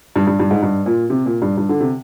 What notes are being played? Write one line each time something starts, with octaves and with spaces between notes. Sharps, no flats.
G2
G2
G2
G#2
G2
A#2
C3
A#2
G2
G2
D3
C3